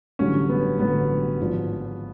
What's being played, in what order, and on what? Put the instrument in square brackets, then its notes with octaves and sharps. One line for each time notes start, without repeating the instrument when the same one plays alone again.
[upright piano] A1 G2 D3 F#3 C#4
B3
A1 G2 D3 F#3 B3
G#1 G#2 F3